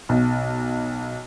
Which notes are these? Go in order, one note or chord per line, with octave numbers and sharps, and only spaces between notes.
B1